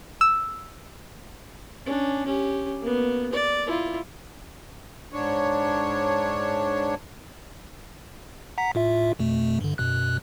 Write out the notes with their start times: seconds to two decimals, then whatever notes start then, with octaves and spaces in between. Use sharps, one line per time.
0.21 E6
1.86 C#4 D4
2.26 C#4 G4
2.81 A#3 B3
3.33 D5
3.66 E4 F4
5.13 G#2 D4 C#5
8.58 F#5 A#5 B6
8.75 A2 F4 E5
9.19 F2 B2 A3
9.61 G2 D3
9.78 F#2 B2 F#6